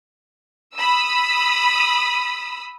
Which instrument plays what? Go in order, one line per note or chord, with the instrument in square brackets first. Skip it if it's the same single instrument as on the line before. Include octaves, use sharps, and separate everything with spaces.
[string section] B5 D#6 E6